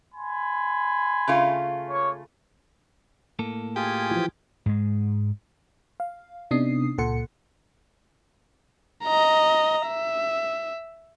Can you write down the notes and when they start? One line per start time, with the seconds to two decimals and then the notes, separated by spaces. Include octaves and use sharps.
0.15 G#5 B5 C6
1.28 C#3 A3 F4
1.90 A#3 C#5
3.39 A2 A#3 A4
3.76 F4 G4 G#4 G#5
4.11 E3 F3
4.66 G#2 G#3
6.00 F5
6.51 C3 B3 D4 D#4 D#6 C7
6.98 C#2 A#2 A4 F#5 C6 C#7
9.04 D#5 A#5
9.87 E5